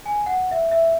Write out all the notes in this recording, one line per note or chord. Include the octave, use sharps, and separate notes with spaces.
G#5
F#5
E5
E5